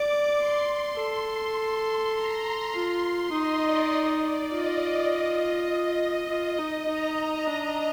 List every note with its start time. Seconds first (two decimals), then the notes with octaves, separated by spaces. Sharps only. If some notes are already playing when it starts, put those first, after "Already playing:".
Already playing: D5 D6
0.36 C6
0.96 A4
2.14 A#5
2.73 F4 C6
3.32 D#4 D#5
3.62 D5
4.21 D5
4.51 F4 D#5
6.29 F4
6.58 D#4
6.88 D#4 A#5
7.47 D4